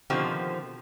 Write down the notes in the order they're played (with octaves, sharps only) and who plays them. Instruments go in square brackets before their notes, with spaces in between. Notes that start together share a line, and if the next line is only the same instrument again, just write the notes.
[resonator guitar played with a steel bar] B2 D3 D#3 F3 C4 G4